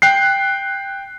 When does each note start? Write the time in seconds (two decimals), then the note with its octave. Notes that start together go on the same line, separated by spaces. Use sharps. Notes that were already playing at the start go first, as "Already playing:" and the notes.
0.02 G5 F#6 C7